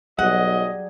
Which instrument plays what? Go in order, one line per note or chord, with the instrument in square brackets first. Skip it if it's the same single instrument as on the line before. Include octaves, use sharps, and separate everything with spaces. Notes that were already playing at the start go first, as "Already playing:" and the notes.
[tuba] B1 [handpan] F#3 G3 G#4 [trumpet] D#5 [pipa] F#5